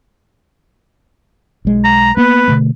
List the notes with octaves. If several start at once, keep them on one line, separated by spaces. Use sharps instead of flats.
B1 G#3
A#5
A#3 B3 B4
B2 D3 A3